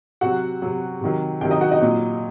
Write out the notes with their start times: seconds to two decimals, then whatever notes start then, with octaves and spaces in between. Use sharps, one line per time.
0.21 C3 F#3 F#4 F#5
0.62 C3 F#3
1.01 C3 D#3 F#3
1.41 C3 D#3 F#3 G4 G5
1.51 D#4 D#5
1.61 F#4 F#5
1.71 D#4 D#5
1.81 A#2 F#3